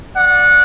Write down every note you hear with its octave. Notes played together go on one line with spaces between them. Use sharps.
D5 F#5